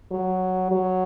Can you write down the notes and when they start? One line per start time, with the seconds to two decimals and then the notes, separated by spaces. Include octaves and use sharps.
0.11 F#3
0.71 F#3